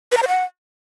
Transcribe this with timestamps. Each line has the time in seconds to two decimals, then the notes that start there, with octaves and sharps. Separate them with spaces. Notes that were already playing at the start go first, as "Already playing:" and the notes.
0.12 B4
0.17 A#5
0.23 C5
0.28 F#5